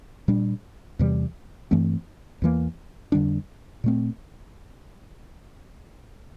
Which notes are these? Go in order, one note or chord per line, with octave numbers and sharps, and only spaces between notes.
A#2 G3 D4
E2 C3 E3 G3
G2 E3 A3 C4
E2 E3 A#3
F2 D3 G3 D4
A#2 A3 C4